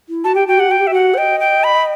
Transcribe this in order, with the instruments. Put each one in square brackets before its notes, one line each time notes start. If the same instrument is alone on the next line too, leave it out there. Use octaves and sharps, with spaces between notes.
[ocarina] E4
[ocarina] F#4 [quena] A5
[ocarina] G4 [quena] G5
[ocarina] F#4 [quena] G5
[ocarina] G4 [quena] F#5
[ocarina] F#4 [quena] G5
[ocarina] G4
[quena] E5
[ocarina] F#4 [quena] F#5
[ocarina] C5
[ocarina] D#5 [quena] G5
[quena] G5
B5